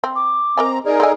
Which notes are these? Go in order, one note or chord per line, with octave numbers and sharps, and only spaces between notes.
C4
D6
C4 A#4 D#5 G#5 A#5
D#4 G#4 A#4 D5
C4 A4 G#5